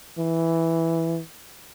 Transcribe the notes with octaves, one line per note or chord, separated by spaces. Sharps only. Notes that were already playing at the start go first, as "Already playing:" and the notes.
E3